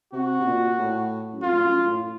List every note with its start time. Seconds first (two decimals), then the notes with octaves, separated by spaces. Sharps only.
0.13 C3 F#4
0.40 C3
0.46 A#2
0.78 A2
1.33 F#2
1.42 F2 F4
1.53 A2
1.63 F#2
1.85 A2